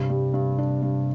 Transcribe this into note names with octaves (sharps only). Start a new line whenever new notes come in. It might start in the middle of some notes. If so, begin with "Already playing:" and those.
Already playing: G2 C3
G3
G2
D4
G2